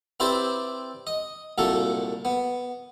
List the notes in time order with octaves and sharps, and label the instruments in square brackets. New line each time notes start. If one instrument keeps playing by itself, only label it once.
[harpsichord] C4 E4 G4 B4 C5 D5
D#5
C2 A#2 F#3 A3 A4 A#5
B3